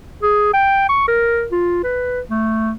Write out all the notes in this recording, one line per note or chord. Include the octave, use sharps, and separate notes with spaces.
G#4
G5
C#6
A#4
F4
B4
A3